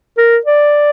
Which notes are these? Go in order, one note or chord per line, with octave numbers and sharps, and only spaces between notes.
A#4
D5